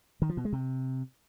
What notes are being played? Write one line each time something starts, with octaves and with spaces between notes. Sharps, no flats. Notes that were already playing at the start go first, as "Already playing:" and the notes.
D#3
F3
B2
G#3
C3